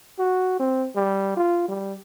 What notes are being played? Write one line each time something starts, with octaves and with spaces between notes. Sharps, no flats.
F#4
C4
G3
F4
G3